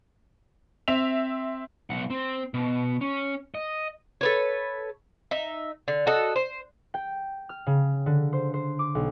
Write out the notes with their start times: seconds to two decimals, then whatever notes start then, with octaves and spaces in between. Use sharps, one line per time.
0.88 C4 E5 F7
1.90 B1 F#5
2.10 C4
2.54 B2
3.01 C#4
3.55 D#5
4.21 A4 B4 C#5
5.31 D#4 E5
5.88 D3
6.07 F#4 A4 D#5
6.36 C5
6.94 G5
7.49 F6
7.67 C#3
8.06 D3
8.33 C5
8.54 C5
8.79 D6
8.95 B1